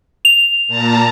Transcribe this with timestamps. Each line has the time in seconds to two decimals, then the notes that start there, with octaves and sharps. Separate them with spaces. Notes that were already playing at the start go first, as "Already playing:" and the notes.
0.25 F7
0.68 A#2 A5 A#5